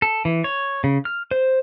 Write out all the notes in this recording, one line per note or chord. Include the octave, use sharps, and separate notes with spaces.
A4
E3
C#5
C#3
F6
C5